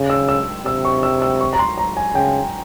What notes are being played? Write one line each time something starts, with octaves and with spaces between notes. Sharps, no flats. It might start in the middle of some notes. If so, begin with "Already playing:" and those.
Already playing: C#3
E6
E6
C3 E6
C#6
E6
E6
C#6
A#5
C6
A#5
G#5
C#3 G5